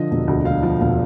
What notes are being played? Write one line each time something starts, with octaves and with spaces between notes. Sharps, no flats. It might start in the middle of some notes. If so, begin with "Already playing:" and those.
Already playing: D3 F3 D#5
E1
D2
D3 F5
F3
E1 F5